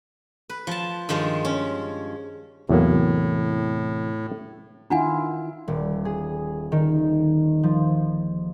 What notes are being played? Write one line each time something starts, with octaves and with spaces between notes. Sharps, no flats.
B4
F3 A5
G2 D#3 F3 G#3
C#4
E2 A2 C3 E3 F#3 A#3
D#3 D4 E4 F4 F#5 G#5
D#1
G#4
D#3
F3